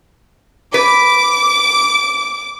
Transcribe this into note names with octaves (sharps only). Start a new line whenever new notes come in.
B4 D6